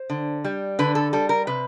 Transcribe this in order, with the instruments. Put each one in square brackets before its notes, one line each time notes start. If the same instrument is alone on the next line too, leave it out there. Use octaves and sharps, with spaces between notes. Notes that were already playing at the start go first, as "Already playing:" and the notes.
Already playing: [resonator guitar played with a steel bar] C5
D3
G3
D3 B4
A4
G3 A4
A#4
C3 B4